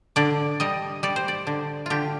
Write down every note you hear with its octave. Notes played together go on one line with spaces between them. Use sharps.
D3 D5
G3 D#5
G3 D5
C5
D5
D3
D3 F4 G4